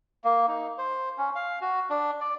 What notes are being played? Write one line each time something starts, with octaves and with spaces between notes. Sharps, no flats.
A#3
D#4
C5
C#4
F5
F#4
D4
D5